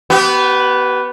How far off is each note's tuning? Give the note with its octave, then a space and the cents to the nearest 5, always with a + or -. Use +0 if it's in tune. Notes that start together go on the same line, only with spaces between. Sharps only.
B3 +0 G4 -35